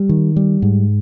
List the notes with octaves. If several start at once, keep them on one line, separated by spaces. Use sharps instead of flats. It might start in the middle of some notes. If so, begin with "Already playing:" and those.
Already playing: G3
D#3
G3
G#2